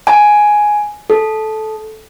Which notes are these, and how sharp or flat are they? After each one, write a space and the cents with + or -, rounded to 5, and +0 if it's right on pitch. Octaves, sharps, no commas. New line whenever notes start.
G#5 +5
A4 -15